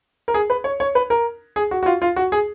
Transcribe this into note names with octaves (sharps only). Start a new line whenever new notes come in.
A#4
G#4
B4
C#5
C#5
B4
A#4
G#4
F#4
F#4
F4
F4
F#4
G#4